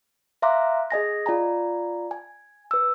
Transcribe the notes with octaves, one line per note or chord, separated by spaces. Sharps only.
E5 F5 A#5 C6 D6 F#6
G#4 D#5 G#5 A#6
F4 D5 G#5 A#5
G#5
B4 E6